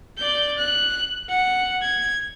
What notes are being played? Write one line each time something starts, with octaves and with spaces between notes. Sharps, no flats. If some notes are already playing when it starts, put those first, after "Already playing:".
D5 G6
F#6
F#5
G#6